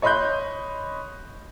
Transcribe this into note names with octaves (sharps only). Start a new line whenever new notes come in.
C#5 D#5 B5 C6 F#6 G6